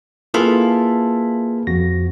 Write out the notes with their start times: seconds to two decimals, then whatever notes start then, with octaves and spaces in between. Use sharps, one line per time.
0.34 A#3 E4 F4 G#4 A4 B4
1.67 F2 F#4 A#6